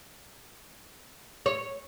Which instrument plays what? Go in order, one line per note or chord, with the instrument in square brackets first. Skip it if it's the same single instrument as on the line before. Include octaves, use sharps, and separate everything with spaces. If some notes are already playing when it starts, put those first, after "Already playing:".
[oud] C#5